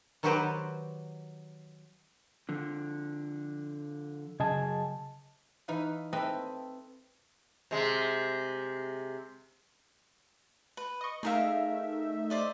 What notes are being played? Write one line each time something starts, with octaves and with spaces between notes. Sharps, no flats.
D#3 F#3 F#4 G4 B4 C5
D3 F3
F#2 C#3 G#4 D#5 G#5 A5
E3 D#4 B4 F5
C4 A4 B4 D#5 E5 A#5
C3 G#3
B4
D#5 C#6
A3 D#4 G#4 A#4 E5 F5
C5 D5 D#5